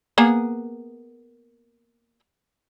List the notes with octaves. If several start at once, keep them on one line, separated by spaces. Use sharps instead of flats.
A#3 B3 G#4